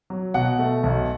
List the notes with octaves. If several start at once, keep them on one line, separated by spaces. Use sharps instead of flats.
F#3
B2 F#5
A3
B1